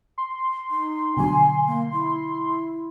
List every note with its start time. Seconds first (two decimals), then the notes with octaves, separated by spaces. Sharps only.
0.18 C6
0.70 D#4
1.17 B2 D3 F#3 G#5
1.67 A#3
1.93 E4